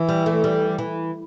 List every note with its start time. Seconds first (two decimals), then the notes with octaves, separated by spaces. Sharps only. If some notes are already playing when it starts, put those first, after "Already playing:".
Already playing: E3
0.09 G3
0.26 A3
0.44 G3
0.79 E3